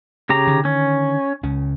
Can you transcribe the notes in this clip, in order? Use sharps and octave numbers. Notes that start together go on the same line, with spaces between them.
C#3 G4 A#5
D3 D#3
C#4
C#2 C#3 C#4